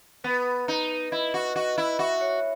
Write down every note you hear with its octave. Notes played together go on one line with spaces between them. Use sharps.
B3 B4
D#4
E4 D#5
F#4
F#4 D#5
E4
F#4 E5
C#5